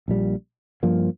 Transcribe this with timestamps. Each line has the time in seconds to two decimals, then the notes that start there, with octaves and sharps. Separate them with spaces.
0.08 A#1 A#2 G3
0.83 G2 F3 A#3